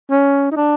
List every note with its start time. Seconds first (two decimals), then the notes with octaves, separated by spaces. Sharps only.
0.10 C#4
0.52 D#4
0.56 D4